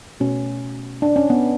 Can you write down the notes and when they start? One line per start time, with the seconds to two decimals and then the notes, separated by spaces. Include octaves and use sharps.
0.20 B2 A3 C#4
1.02 D4
1.16 C#4
1.30 B3